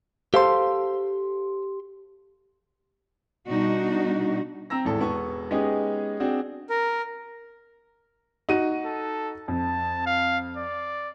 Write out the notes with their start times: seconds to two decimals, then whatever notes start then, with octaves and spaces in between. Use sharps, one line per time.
0.34 G4 A4 C5 F5 C6
3.47 B2 G3 D4 D#4 F#4
4.70 C4 A#5 E6 A#6
4.85 G#1 E2 A2 A4
5.00 E1 B3 A5 C#6
5.51 G#3 B3 C#4 D#4 G4 G#4
6.20 C4 D4 F#4 G#4
6.70 A#4
8.49 D#4 F#4 D#7
8.85 A4
9.48 F2 A5
10.07 F5
10.57 D5